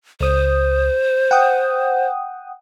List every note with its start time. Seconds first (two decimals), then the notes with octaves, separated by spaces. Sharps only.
0.21 C#2 C5 D#6
1.31 F#5 G5 D#6